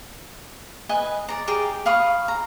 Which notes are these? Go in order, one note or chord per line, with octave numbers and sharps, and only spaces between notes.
B4 D#5 G#5
D5 A#5
G4 G#4 A#5 D6
F5 B5 C#6 D#6
A#5